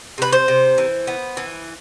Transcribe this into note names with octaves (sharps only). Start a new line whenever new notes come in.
C3 B4
C5
C3
E3
B3
E3